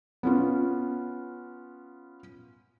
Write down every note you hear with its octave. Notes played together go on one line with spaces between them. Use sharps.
B3 C#4 F4